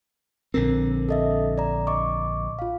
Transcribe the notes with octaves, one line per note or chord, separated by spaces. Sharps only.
A#1 D3 C4 A#4
A4 D#5 E5
D5 A#5
D#5 C#6 D6
F4 F5